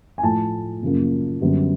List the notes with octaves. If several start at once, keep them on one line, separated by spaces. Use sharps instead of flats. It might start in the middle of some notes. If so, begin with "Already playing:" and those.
G#5
A2 F3 A3 A5
F#2 C#3 F3 A#3
F#2 D3 G3 B3